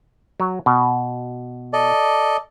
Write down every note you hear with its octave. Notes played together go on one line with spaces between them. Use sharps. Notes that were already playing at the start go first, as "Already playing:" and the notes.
F#3
B2
A4 D5 D#5